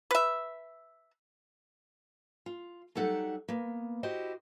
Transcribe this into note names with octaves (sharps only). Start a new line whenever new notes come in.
B4 E5
F4
F#3 G3 D#4 A4 E5 F#5
A#3 B3
E4 F#4 G4 C5 D#5